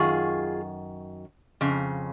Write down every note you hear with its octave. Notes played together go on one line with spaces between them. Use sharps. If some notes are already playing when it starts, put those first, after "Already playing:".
Already playing: F#2 D#3 F4 G#4
F2 C#3